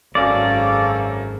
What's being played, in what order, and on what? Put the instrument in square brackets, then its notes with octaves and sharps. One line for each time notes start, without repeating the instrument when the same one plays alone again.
[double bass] G#1 [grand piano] F#2 [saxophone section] C#4 A4 F5 [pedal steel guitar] D5